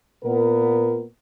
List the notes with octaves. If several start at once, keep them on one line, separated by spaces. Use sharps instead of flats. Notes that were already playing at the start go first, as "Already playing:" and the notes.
A#2 B3 A#4